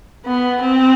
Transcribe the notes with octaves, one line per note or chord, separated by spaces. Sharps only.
B3
C4